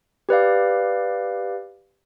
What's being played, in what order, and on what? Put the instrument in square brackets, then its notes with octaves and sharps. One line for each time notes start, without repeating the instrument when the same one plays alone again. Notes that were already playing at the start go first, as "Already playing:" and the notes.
[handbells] G4 B4 D5 F5